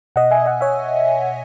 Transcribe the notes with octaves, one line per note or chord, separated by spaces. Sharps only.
B2 D#5 F#5
E5 G#5
D#5 F#5
C#5 E5